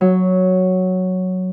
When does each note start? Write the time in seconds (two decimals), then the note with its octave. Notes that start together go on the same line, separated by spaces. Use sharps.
0.01 F#3